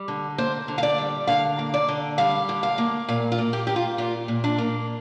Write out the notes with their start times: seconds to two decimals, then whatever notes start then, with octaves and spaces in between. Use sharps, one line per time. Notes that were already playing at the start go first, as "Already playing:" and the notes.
Already playing: G3
0.08 D3
0.38 A#3 C5
0.68 D3
0.78 F5
0.83 D5
0.98 G3
1.27 D3 F5
1.59 A#3
1.74 D5
1.88 D3
2.18 G3 F5
2.49 D3
2.63 F5
2.78 A#3
3.08 A#2 F5
3.32 F4
3.38 A#3
3.53 G4
3.67 A#3 G4
3.76 F4
3.98 A#2 F4
4.28 A#2
4.44 D4
4.58 A#3